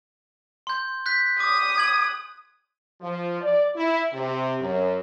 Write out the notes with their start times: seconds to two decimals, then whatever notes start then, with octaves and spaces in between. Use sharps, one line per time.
0.67 C6 G6
1.06 F#6 G6 B6
1.40 D6 D#6
1.78 G#6 F#7
3.01 F3
3.41 D5
3.75 E4
4.12 C3
4.59 F#2